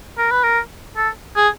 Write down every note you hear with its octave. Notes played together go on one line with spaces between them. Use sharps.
A#4
B4
A#4
A4
G#4